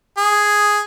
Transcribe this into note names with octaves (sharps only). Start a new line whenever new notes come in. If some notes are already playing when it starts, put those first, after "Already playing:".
G#4